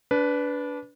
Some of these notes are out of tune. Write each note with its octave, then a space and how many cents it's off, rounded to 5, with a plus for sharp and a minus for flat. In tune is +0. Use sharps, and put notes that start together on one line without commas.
D4 -20 B4 +0